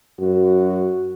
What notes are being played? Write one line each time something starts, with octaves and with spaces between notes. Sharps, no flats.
F#2 F#4